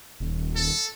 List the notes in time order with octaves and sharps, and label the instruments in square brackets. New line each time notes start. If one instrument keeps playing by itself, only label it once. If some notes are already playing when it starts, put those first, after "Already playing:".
[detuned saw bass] D#1
[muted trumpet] A4